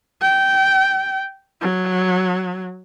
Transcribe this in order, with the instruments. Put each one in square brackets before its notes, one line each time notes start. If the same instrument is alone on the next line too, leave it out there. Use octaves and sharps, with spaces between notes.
[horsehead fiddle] G5
F#3